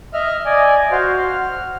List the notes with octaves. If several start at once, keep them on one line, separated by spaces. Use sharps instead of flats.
D#5 E5 F6
D5 D#5 G#5
F#4 C5 F5
F6